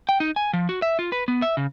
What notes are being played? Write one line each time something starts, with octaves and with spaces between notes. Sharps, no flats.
G5
D#4
G#5
F3
F#4
E5
F4
B4
B3
E5
C#3